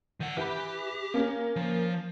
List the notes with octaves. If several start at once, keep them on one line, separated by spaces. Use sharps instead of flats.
D#3 F#5
E3 G4 B5
A#3 C#4
F3